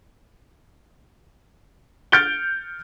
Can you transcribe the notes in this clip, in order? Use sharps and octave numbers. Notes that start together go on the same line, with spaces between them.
F6 G6 A6 C#7 D7 G7